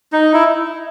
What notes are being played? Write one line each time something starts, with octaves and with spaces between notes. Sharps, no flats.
D#4
E4